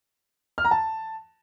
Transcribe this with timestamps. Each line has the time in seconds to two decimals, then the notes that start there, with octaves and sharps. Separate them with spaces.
0.58 F6
0.65 A#5
0.71 A5